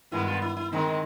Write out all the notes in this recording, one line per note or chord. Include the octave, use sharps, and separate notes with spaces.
G2 D#3 G#3 B3 E4
F4
E4
E4
D#3 G#3 C4 D#4